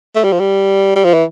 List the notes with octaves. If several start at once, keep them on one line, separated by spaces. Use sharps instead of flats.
A3
G3
F3
G3
G3
F3
E3